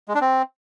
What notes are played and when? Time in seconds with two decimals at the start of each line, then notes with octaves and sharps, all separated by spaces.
0.08 G#3
0.15 D4
0.21 C4